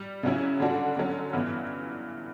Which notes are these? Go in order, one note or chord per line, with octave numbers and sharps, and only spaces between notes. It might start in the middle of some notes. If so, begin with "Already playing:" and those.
Already playing: G3
C#3 F#3 C#4 E4
D3 G3 D4 F#4
D3 F#3 C#4
G2 E3 B3 E4